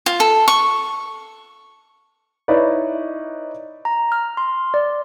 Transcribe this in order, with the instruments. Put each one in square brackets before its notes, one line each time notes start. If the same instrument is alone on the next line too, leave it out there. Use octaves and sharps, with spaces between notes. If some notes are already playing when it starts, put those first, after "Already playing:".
[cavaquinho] F4
A4
C#6
[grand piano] D#4 E4 B4 C#5 D5
[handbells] A#5
F6
C6
D5